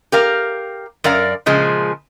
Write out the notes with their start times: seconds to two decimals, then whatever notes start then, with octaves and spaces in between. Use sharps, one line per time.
0.12 G4 A#4 F5
1.04 F#2 A#4 D5 F5
1.46 A#2 C#3 F3 G#3